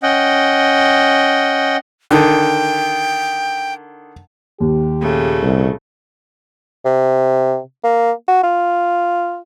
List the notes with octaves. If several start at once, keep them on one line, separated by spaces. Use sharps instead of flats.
C#4 D#5 F#5 G5
D3 D#3 G5
D#2 G4
A#2 C#3 A3
C2
C3
A#3
F#4
F4